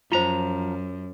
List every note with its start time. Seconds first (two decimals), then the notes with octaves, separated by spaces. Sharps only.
0.12 F#2 F3 F4 C5 A#5